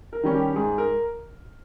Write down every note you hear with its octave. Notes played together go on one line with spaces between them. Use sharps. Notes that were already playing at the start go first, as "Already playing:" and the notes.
A#4
D#3 G3 C#4
G4
G#2 G#4
A#4